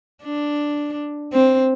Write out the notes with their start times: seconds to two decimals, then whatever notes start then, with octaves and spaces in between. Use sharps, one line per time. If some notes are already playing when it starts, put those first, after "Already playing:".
0.24 D4
1.33 C4